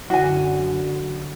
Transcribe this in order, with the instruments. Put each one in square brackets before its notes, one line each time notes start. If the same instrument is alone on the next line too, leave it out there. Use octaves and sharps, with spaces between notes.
[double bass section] F#2 D3 [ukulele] F#4 G#5